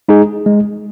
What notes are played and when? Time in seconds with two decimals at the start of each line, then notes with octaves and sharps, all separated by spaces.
0.08 G#3 D#4 G#4
0.46 G#3